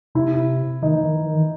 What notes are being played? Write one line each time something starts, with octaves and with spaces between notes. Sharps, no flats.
C3 E4
D#3 D#4
E3
D#3
E3
D#3